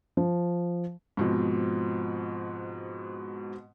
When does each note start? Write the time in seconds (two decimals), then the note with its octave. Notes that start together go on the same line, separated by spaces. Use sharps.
0.17 F3
1.17 G#2 B2 F3 C4